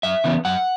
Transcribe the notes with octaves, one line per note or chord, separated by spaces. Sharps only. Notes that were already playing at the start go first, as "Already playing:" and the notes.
F#2 E5
C#3 E3 B3
F#2 F#5